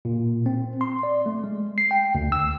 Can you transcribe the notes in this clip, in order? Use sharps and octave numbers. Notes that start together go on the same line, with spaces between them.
A#2
C4
C6
D5
A3
G#3
C7
G5
D2
E6